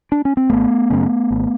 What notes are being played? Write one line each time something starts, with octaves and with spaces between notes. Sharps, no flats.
D4
C#4
C4
G#1 A3 B3
F#2 C#3
G#1